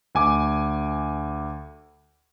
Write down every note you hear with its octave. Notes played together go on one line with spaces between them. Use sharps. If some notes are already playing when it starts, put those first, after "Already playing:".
D2 G#5 D6